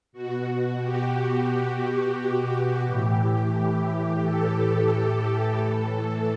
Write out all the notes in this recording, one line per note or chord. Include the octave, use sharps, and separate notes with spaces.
B2 F#4
G4
A2 E3 G4
A4
G4
A4
A2 E3